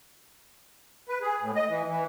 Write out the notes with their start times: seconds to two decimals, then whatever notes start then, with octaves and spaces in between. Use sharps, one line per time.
1.09 B4
1.21 G#4
1.41 A2
1.55 D#5
1.69 E3
1.88 E3